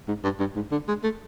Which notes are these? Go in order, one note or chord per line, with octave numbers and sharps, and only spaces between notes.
G#2
G2
G2
G#2
D3
G#3
A3